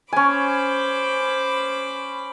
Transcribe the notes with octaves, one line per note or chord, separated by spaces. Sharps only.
C#4 C5 G#5 B5 D6